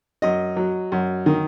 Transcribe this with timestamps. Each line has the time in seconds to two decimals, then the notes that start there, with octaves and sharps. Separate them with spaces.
0.22 F#2 D#5
0.57 F#3
0.92 F#2
1.26 D#3